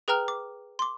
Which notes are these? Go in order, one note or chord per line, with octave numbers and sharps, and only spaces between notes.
G#4 B4 G5 A#5 F6
D6
C6 D6